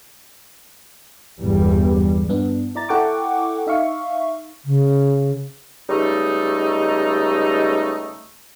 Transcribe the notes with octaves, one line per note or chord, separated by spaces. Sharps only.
G1 E2 G3
G2 B3 D4
E4 D5 A#5 A6
E4 A4 F#5 G5 C#6 D6
D#4 E5 F5 C#6
C#3
C#2 G3 A3 D#4